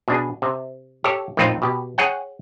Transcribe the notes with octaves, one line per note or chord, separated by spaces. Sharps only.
B2 D4 G#4
C3
G4 A4 C#5
A#1 F2 A2 C4 D#4 F4
B2 G4
G#4 C#5 F#5 G5